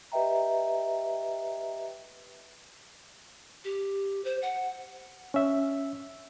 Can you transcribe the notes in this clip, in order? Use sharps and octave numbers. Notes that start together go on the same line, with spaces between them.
G4 B4 D#5 E5 G5 A#5
G4
C5
F#5
C#4 E5